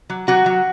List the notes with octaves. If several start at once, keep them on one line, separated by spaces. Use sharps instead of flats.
F#3
F#3 F#4
F#3